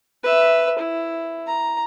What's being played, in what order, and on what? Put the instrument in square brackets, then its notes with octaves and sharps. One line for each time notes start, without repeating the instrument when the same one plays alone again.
[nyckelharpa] B4 E5
E4
A#5